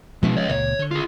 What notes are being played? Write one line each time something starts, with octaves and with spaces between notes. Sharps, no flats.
B2 E3 F3 G#3 C#4
C#5 D#5
C#2 A#2 C#5
D3
F4 G#4